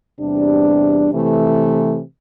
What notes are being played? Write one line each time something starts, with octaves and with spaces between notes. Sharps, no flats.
E2 C3 G3 D4
C3 E3 A3